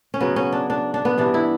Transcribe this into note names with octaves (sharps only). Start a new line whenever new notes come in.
C#4
C#3 F#3 B3
C#4
D4
D4
D4
B3
G2 E3 G3 D4
E4